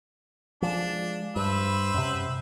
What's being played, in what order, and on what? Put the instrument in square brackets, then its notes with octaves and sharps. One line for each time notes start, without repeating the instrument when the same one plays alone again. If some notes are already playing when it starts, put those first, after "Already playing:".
[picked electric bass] F3 G#3 [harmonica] D4
[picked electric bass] G2 [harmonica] B4 C5 E5
[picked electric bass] F#2 C3